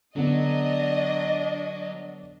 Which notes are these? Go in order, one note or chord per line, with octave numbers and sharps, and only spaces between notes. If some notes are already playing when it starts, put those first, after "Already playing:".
D3 F#3 B3 D4 D#5